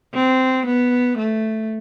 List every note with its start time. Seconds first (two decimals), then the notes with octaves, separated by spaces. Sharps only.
0.14 C4
0.66 B3
1.18 A3